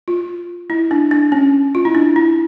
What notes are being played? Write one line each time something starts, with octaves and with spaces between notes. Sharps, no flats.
F4
E4
D4
D4
C#4
F4
E4
D4
E4